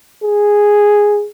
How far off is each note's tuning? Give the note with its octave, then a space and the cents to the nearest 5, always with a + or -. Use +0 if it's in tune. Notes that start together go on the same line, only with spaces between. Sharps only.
G#4 -5